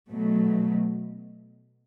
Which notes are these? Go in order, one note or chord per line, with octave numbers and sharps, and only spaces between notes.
B2 F#3 A3